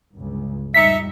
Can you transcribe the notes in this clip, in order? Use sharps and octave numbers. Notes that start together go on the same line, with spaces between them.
G1 C#2
F2 A2 G3 D#4 E5 B6 C#7